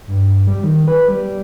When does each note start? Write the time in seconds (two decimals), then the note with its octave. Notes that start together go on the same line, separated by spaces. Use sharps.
0.07 G2
0.47 G3
0.63 D#3
0.88 B4
1.08 G3